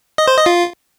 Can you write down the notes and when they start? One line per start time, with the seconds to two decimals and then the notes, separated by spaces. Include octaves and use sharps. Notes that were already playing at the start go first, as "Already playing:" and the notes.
0.18 D#5
0.28 C5
0.37 D#5
0.46 F4